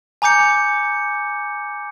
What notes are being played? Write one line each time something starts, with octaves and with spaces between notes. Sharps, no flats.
G#5 A#5 D6 G6 C#7